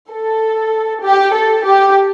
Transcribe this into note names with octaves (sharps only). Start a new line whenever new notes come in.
A4
G4
A4
G4